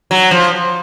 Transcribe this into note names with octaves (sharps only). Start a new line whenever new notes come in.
F#3
F3